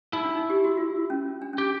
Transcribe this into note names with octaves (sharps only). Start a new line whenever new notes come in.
D#4 E4
D4
D#4
G4
F#4
F4
C#4
D4
C#4
D4 G4